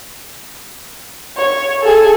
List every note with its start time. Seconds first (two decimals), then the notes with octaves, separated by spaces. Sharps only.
1.37 C#5
1.82 G#4 A4